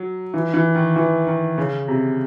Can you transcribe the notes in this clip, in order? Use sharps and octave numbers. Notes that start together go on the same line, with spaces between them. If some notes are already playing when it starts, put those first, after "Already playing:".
Already playing: F#3
E3
E3
D#3
E3
D#3
C#3
C3